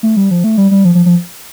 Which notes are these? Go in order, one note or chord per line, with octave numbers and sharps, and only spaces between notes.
A3
G3
F3
A3
G3
G3
F3
F3
F3